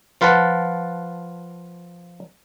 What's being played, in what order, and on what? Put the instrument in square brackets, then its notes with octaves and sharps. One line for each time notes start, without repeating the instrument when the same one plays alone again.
[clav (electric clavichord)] F3 F4 B4 F#5 A5